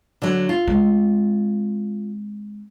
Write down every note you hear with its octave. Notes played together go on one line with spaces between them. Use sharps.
D3 F#3
F4
G#3 C4